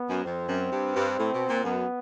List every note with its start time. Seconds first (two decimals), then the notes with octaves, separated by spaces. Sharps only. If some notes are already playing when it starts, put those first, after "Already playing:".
Already playing: B3
0.09 F#2
0.24 F2 C4
0.48 F#2
0.71 G2
0.94 G2
1.18 A2
1.33 B2
1.48 A#2
1.64 F#2 B3